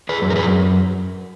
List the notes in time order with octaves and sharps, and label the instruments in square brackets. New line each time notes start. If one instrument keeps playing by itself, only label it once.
[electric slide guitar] G#4 B4
F#2
A#4
G#4 B4